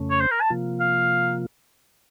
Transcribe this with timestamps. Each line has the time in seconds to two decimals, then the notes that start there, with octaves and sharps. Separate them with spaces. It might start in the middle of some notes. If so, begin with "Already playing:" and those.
Already playing: F2 C#3 A3 C#4
0.11 C#5
0.21 C5
0.31 A#4
0.41 A5
0.50 C3 F3 A#3 F4
0.80 F5